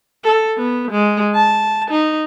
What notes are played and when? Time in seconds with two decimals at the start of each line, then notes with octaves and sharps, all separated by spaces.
0.24 A4
0.58 B3
0.91 G#3
1.35 A5
1.91 D#4